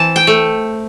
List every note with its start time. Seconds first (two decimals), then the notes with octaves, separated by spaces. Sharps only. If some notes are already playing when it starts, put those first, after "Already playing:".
Already playing: E3 C4 A5
0.16 G5
0.27 A3